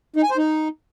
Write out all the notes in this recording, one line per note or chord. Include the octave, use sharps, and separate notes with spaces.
D#4
G#5
C5
D#4